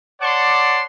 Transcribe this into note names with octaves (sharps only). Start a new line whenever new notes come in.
C#5 D5 F#5 A5 C6 D6